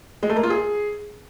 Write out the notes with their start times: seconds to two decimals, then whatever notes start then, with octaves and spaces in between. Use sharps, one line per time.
0.23 G#3
0.30 A3
0.36 A#3
0.43 F4
0.50 G#4